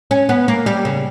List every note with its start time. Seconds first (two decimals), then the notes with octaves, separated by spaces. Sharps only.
0.11 C#4
0.29 B3
0.48 A#3
0.66 G3
0.85 C#3